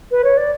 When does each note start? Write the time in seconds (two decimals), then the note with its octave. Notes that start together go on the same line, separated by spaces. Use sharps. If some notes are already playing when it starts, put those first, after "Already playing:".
0.11 B4
0.24 C#5
0.37 D5